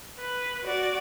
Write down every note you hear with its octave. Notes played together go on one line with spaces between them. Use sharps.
B4
F#4 D5